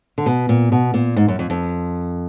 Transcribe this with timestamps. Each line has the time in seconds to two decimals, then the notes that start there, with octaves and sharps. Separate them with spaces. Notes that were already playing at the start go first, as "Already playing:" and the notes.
0.18 D3
0.26 B2
0.49 A#2
0.72 B2
0.94 A#2
1.16 G#2
1.28 F#2
1.39 F2
1.50 F2